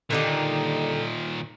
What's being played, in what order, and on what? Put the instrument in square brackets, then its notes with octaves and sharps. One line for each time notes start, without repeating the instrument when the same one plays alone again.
[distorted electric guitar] A#2 D#3 [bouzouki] D3 D#4 G4